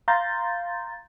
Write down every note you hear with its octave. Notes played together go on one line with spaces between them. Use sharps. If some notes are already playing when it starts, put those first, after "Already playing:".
F5 A#5 C6 G6 A6